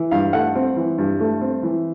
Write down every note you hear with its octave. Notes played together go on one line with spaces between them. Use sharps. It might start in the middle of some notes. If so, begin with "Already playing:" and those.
Already playing: E3
G2 F5
A3 F#5
C4
E3
G2
A3
C4
E3